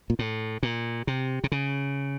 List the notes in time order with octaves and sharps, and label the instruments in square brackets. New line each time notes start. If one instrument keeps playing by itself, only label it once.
[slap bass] A#2
A2
A#2
C3
C3
C#3